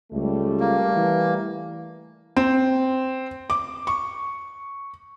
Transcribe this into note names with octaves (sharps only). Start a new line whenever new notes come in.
C#2 G3 A3
A#3
E3
C4
D6
C#6